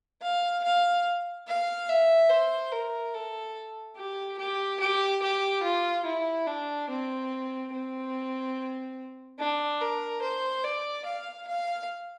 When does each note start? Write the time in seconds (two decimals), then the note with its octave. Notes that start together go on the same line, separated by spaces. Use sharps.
0.22 F5
0.64 F5
1.48 F5
1.89 E5
2.30 C5
2.72 A#4
3.14 A4
3.96 G4
4.39 G4
4.80 G4
5.22 G4
5.63 F4
6.05 E4
6.47 D4
6.89 C4
7.73 C4
9.39 D4
9.81 A#4
10.22 C5
10.64 D5
11.06 F5
11.47 F5